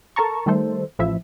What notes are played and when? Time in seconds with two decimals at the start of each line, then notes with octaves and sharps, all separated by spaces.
0.16 A4 A#4 A5 A#5 C#6
0.46 D#3 G3 A3 A4 C5
0.99 A1 F3 E4 E5